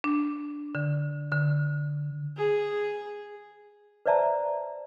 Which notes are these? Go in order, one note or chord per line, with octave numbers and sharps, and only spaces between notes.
D4
D3
D3
G#4
B4 C5 D5 E5 A5 A#5